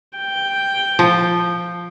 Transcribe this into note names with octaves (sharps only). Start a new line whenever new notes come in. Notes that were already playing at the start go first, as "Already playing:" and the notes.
G5
F3